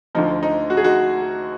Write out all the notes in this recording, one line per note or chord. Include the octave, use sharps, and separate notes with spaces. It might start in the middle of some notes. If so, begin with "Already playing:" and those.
D2 D3 F3 D#4
D#4
F#4
G#4
D#4 F#4